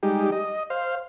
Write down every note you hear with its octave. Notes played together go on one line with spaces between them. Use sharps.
G3 G#3 D#4 G4
D#5
C5 F5